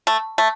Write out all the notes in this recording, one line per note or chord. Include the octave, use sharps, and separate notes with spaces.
A3
A3